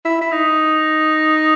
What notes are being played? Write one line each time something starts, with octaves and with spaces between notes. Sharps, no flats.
E4
E4
D#4